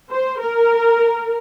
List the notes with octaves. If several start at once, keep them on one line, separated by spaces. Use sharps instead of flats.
C5
A#4